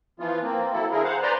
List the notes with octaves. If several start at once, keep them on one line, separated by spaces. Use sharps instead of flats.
E3 F3 B3 F4
A#3 C4
F#3 E4 A4
D3 E4 G#4 A#4
C5 F5 F#5
B4 C5 D5 A#5 C6